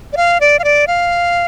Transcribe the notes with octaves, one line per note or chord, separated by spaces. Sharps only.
D5
F5
D5
F5
D5
F5